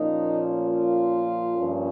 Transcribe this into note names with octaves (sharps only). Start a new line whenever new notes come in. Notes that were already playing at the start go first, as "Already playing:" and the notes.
Already playing: A#2 F3 A#3 C#4 D#4
F4
G2 F3 A#3 C#4